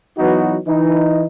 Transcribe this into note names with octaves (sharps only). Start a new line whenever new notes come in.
E3 F#3 B3 D#4 F#4
E3 D#4